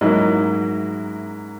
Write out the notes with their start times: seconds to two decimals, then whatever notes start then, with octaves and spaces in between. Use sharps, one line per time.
0.01 G#2 F#3 A#3 E4 D#5